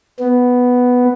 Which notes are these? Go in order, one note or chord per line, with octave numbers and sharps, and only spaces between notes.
B3